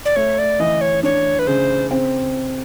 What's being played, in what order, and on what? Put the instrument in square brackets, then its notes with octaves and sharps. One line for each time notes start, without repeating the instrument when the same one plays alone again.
[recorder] D5
[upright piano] A3 [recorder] C#5
[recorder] D5
[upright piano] E3 [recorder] D#5
[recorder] C#5
[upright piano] D4 [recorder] C#5
[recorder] B4
[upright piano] C#3 [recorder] C5
[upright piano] C4